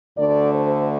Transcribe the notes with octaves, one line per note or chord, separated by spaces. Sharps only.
D2 D3 A3 D5
C5